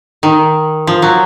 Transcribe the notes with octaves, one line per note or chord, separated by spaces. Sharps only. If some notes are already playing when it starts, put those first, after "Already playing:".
D#3
F3
F#3